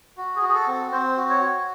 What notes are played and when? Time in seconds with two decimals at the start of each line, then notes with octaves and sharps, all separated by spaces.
0.17 F#4
0.36 G#4
0.42 F#4
0.49 G#4
0.54 A4
0.67 C4
0.74 A4
0.92 C4 C5
1.17 F#4
1.29 C#5
1.42 F#4